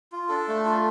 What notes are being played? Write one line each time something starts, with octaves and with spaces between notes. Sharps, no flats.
F4
D4 A4
A3
F4